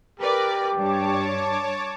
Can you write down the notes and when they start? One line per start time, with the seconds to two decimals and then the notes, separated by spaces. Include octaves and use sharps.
0.20 G4 A#4 B4 D5
0.76 G2 C#5 A5 D6